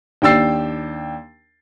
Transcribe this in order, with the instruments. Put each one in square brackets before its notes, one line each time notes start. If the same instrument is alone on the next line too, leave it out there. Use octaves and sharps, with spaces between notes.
[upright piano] D#2 D4 G5 E6 A6 C7